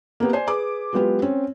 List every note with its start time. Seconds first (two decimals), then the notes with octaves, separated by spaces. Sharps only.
0.20 A#3 B3 G4
0.33 C5 D5 G#5
0.47 G#4 B4 D6
0.93 F#3 G#3 B3 F4 G4 B4
1.22 C4 C#4